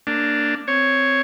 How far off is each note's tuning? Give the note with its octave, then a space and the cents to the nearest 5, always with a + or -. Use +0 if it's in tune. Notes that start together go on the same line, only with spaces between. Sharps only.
A#3 -20 D4 +0
C4 +0 C#5 +0